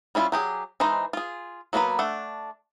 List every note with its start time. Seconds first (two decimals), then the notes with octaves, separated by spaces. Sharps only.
0.15 G3 C#4 E4 F4
0.32 F#3 G4 G#4
0.80 E3 G#3 D#4 C5
1.13 F4 G#4
1.73 F#3 A#3 B3 E4 B4
1.99 A3 D4 A4 F#5